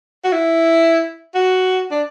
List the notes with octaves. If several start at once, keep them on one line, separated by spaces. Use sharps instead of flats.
F#4
E4
F#4
D4